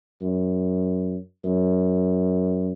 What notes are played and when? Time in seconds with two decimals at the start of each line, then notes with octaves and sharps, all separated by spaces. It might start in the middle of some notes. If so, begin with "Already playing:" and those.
0.22 F#2
1.44 F#2